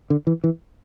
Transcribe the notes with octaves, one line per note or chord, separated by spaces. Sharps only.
D3
E3
E3